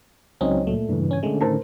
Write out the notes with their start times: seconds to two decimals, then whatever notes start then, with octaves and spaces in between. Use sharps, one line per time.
0.41 C#2 F#3 C4 C#4 D#4 D#5
0.67 A#2 A3
0.89 G2 C#3 E3
1.11 C#4 G#5
1.23 D3 G#3 A3 C#4
1.41 A2 D#3 A#4 C5 A5